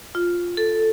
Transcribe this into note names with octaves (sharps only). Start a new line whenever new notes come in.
F4
A4